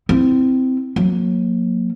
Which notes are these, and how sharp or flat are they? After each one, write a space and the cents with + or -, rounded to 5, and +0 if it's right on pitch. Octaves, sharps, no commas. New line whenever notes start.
C4 -15 E4 -5
F#3 -35 A#3 -5